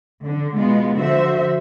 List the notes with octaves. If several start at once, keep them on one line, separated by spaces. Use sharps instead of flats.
D3
B2 G#3 B3 F4
D3 F3 F#4 C5 E5